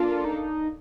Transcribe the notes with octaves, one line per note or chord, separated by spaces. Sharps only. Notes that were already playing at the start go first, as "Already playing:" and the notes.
Already playing: A#3 D4 F4 A4
D#4